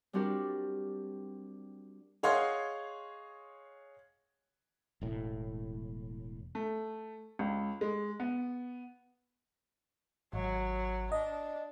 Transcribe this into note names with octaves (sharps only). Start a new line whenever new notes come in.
G3 C4 D4 F#4 G4 A#4
G#4 C#5 D#5 F5 F#5 C6
E1 A2
A3
C#2
G#3
B3
G#1 F#3
D4 D#5